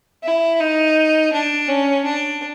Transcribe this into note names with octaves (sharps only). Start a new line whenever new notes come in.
E4
D#4
D4
C#4
D4